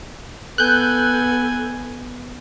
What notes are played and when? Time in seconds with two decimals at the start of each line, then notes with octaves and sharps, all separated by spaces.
0.58 B3 A4 G#5 F#6 G6